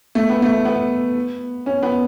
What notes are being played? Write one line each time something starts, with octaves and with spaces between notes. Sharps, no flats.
A3
B3
A3
B3
C#4
B3